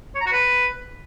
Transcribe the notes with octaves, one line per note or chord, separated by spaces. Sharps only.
C#5
A#5
F#4
B4